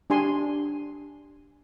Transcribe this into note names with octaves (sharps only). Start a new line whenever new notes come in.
D4 G4 G#5 C6